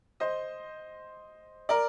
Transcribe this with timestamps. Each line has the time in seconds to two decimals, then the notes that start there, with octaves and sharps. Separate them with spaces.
0.20 C5 D#5
1.69 A#4 D5